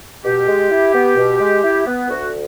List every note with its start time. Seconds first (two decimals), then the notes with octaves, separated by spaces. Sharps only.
0.25 B2 G4
0.48 G#3
0.71 E4
0.94 B3
1.17 B2
1.40 G#3
1.63 E4
1.86 B3
2.09 D2 F#4